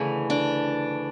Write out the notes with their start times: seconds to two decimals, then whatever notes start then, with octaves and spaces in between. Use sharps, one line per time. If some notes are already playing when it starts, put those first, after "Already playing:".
Already playing: D2 C#3 E3
0.30 D4